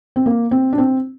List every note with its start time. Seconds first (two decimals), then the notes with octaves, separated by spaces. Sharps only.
0.16 C4
0.26 A#3
0.51 C4
0.73 D4
0.78 C4